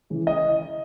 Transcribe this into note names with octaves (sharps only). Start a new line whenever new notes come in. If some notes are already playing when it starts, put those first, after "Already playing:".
C#3 E3
D#5